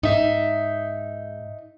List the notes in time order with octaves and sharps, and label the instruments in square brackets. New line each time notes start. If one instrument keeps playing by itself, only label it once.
[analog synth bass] G#2 [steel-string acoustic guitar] D#4 E5